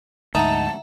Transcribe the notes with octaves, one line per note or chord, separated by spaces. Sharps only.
D2 G#2 D#4 E5 F#5 A5 A#5